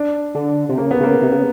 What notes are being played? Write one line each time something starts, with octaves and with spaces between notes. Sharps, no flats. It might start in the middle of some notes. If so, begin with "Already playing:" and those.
Already playing: D4
D3
C3
C#3 A#3
B3
C#3 A#3
C3
C#3